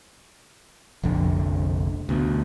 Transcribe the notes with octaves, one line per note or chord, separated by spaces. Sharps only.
F1 A#1 F2 D3
D2 B2